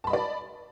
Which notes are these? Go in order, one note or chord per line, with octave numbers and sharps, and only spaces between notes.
D5 D#5 A5 B5